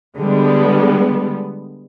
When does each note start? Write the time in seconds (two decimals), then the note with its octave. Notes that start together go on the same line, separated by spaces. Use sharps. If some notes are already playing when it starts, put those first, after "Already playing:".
0.19 D3 G3 G#3 B3